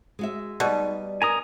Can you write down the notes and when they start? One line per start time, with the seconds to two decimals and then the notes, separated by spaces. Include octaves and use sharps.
0.19 G#3 F#4 E5
0.60 B2 G3 D#4
1.22 D4 A#4 G#5 A#5 D#6